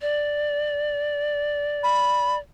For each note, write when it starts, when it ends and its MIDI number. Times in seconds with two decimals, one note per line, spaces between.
0.01 2.39 74
1.83 2.36 83